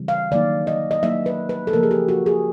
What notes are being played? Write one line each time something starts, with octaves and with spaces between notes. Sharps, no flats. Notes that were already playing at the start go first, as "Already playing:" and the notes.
Already playing: C#3 E3 G3 C4
F5
D#3 F#3 A#3 D#4 D5
D#5
D#5
F#3 A#3 D#4 E5
B4
B4
A4
C#3 F3 A#3 A#4
G#4
G4
F#4
G#4